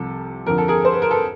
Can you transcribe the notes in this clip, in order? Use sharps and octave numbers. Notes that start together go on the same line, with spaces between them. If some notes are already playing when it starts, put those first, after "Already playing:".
Already playing: C2 C3 F3 A4
F2 D3 F3 A#4
A4
G#4 A#4
C5
B4
A#4
A4 B4